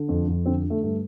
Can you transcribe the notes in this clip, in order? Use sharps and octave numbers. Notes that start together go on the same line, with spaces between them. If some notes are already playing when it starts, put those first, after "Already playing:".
Already playing: D3
F2
F2
D3 C4
D3
A3
G2 A3